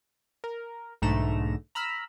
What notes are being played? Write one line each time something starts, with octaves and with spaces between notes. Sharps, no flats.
A#4
B1 G#2 D3 A3 A#5 E7
A#5 B5 E6 F6